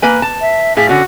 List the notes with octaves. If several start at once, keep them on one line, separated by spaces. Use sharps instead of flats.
A#3 B4 G#5
A5
E5
A2 G#4 F5 B6
D3 C#4 F#4